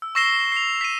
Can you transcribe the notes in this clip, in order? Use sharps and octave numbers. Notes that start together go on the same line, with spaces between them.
E6
C#6 E6 A#6 C7 E7 G7
C7 F7
B6 D#7